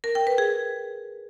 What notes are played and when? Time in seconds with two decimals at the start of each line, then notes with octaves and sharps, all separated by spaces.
0.04 A#4
0.15 G5
0.27 B4
0.38 G#4